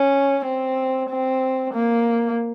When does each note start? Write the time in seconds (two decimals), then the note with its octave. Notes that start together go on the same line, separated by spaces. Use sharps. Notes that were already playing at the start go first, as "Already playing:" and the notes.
Already playing: C#4
0.45 C4
1.10 C4
1.74 A#3